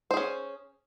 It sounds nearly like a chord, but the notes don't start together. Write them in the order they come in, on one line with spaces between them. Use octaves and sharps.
C5 G#4 C#4